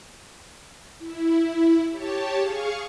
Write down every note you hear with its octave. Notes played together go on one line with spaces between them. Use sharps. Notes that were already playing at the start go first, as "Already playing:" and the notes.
E4
G4 C#5 A5
G#4 F5 C#6